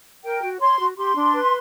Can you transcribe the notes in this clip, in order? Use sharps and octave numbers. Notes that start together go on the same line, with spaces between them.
A#4 G5
F#4
C#5 C6
F#4
G4 C6
D4
B4